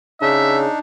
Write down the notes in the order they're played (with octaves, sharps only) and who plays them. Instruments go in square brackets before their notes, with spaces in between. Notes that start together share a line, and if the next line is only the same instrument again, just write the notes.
[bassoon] C#3 [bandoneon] D4 D#4 [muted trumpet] E5